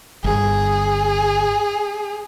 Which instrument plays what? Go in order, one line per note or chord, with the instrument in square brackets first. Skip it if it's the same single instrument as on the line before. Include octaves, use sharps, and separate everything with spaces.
[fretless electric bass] G1 [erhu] G#4